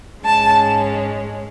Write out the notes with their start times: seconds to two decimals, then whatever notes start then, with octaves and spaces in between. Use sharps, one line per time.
0.25 G#2 G#3 C#4 A5